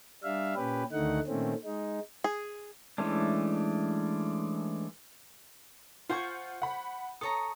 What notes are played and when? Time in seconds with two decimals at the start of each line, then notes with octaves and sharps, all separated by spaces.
0.23 G3 D4 E5 F5
0.56 A#2 C#4 G4 B4
0.92 D2 D3 D#3 A3 D#4 F#5
1.27 A#2 D#3 A3 C4 C#4
1.65 G#3 D#4
2.24 G#4
2.98 E3 G#3 A3 C#4 D4
6.09 F4 C5 F#5 G#5 C#6 G6
6.62 F#5 B5
7.21 A4 C#5 A#5 D#6